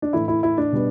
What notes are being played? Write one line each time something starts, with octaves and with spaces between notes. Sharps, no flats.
D4
A2 E3 A3 E4
E4
E4
D4
B2 G3 B3